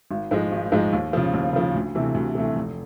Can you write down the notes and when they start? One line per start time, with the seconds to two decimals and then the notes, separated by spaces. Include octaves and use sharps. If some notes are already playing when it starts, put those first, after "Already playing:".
0.11 G#1
0.31 G#2 F3 G#3
0.52 G#1
0.72 G#2 F3 G#3
0.93 D#2
1.13 C#3 F3
1.34 D#2
1.53 C#3 F3
1.75 D2
1.95 C3 E3 A3
2.15 D2
2.35 C3 E3 A3
2.56 F1